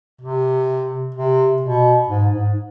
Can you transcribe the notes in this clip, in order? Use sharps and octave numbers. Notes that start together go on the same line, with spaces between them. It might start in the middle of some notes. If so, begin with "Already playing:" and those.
C3
C3
B2
G#2
G#2